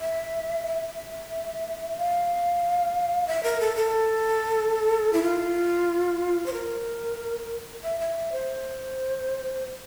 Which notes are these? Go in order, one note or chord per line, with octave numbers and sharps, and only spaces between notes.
E5
E5
F5
E5
A#4
A4
A4
E4
F4
C5
A#4
E5
E5
E5
C5